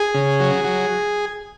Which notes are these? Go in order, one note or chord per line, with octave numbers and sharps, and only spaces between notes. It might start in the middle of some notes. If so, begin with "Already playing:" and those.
Already playing: G#4
C#3
F#3
F#3